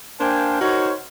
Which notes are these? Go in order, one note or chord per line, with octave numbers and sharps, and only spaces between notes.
A#3 D4 C5 F5 G5 G#5
D#4 F#4 A#4 C5 C#5